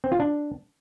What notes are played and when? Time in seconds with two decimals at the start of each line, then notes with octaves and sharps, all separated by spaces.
0.04 C4
0.12 F4
0.20 D4